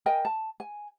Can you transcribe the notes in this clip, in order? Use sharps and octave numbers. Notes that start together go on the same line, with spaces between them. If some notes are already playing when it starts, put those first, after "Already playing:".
A#4 D#5 G5 G#5
A5
G#5